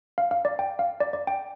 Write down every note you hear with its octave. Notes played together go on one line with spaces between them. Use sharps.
F5
F5
D5
G5
F5
D5
D5
G5